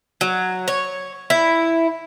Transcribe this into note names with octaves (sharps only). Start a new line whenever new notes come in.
F#3
C#5
E4